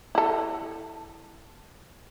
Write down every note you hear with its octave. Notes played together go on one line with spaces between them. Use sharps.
E4 A4